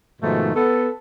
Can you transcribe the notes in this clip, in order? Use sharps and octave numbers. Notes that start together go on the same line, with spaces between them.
G#2 B2 D#3 F3 A3
B3 A4